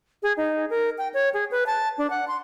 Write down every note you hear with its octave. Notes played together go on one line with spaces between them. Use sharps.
G#4
D#4
A#4
G5
C#5
G#4
B4
A5
D4
F#5
C6